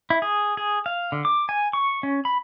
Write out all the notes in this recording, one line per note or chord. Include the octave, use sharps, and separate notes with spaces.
E4
G#4
G#4
F5
D3
D6
G#5
C#6
C#4
B5